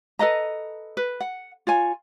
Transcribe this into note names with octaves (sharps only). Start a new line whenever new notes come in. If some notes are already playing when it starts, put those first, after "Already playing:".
A4 B4 D#5 A#5
B4
F#5
F4 C#5 G#5